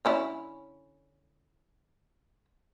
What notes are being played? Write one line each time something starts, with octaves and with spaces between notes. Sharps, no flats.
D3 C#4 E4